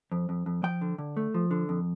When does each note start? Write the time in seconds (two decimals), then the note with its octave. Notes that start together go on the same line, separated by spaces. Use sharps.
0.12 F2
0.29 F2
0.46 F2
0.63 F3 G5
0.81 D3
0.98 D3
1.17 A3
1.34 F3
1.51 D3
1.69 F2